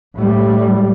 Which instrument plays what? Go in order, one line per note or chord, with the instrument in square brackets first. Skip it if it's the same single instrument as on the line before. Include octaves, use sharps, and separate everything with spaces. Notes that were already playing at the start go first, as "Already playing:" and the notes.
[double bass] A2 G3